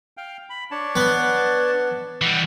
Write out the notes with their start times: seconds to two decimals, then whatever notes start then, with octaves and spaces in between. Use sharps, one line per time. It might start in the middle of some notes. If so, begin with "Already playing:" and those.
0.17 F5 G5
0.50 B5
0.71 D4 C#5 A5
0.96 B3
2.22 E3 G3 D#5 F#5